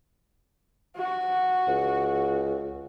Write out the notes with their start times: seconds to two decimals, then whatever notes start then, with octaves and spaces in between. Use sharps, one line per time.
0.97 F#4
1.68 C#2